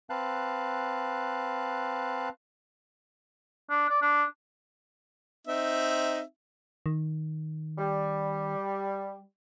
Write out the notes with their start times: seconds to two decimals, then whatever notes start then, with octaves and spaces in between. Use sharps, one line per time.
0.10 C4 B4 F5 A5 F#6
3.70 D4
3.89 D5
4.02 D4
5.47 C4 D#4 E5
6.86 D#3
7.78 G3